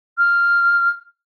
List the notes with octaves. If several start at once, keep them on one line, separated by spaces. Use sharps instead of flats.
F6